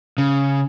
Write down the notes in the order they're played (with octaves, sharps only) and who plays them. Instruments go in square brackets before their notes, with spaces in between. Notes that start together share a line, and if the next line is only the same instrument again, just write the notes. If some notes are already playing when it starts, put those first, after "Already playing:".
[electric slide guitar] C#3